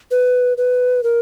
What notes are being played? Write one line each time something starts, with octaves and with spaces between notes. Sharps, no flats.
B4
B4
A#4